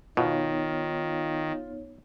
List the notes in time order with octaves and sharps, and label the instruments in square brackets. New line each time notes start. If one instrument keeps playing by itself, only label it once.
[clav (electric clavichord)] B2 [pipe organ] D#3 [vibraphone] B3 D#4 C#5 [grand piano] F4